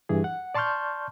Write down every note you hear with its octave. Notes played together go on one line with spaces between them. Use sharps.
G2 E3 G#4
F#5
D5 A5 C6 C#6 F6 G6